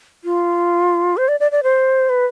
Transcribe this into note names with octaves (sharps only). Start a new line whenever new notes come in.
F4
C5
D5
D5
D5
C5
B4